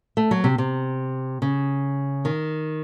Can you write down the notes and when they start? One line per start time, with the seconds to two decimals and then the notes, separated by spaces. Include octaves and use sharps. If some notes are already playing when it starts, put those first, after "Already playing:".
0.17 A3
0.31 F#3
0.44 C3
0.58 C3
1.42 C#3
2.25 D#3